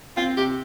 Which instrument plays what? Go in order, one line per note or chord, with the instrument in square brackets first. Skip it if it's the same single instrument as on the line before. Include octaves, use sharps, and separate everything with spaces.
[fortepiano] C4 [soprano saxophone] F4
[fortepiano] C3 [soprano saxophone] G4